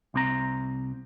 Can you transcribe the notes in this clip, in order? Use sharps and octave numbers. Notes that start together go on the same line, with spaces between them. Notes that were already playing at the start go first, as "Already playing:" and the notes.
C2 C4 A#5